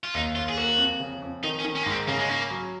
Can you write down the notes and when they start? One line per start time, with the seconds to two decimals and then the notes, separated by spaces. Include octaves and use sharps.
0.04 F4
0.14 D#2 D#4
0.35 D#2 F4
0.49 G#4
0.57 A#3 F#4
0.78 F2
1.00 C#3
1.22 F2
1.43 D#3 D#4
1.59 C#4
1.65 D#3
1.75 C#4
1.83 G#2 A#3
1.91 C4
2.08 C#3 A#3
2.19 G#3
2.29 A#3 C#4
2.50 F#3